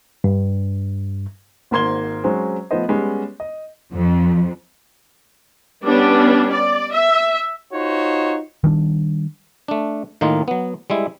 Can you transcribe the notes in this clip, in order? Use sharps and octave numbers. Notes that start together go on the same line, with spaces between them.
G2
G#1 G#2 A#3 C6 G#6 G7
F#3 G#3 C4 C#4
F3 A3 B3 C5 D#5
G3 G#3 B3 C#4
D#5
F2
G3 B3 C#4 D4
D5
E5
D#4 F4 F#4 C5 C#5
D#3 G3 D4
A3 D4
A2 D#3 A#3 D#4 F4
F#3 B3
G3 G#3 E4